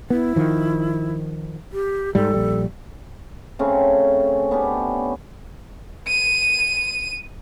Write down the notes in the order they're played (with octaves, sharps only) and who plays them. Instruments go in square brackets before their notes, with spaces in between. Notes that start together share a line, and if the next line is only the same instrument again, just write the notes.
[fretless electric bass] B3 [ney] E4
[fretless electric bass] D#3 F3
[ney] G4
[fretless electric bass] G#2 G3 [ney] A4
[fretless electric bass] A#1 G3
[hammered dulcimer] C#3 A3 C4 C#4
B3 C#4 D4 G4
[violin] D#7